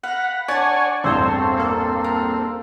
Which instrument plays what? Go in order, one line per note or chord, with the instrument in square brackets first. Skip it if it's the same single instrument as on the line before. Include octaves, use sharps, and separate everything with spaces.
[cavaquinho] F5 [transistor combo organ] F#5 [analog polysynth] B5 A#6
[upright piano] D4 [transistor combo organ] C#5 G#5 [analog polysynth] D5 [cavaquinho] F#5 A5
[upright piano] A1 E2 G2 [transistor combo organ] C4 [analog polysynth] A4 C5 C#5
[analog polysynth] A#3 A4
[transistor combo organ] C4
[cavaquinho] A#4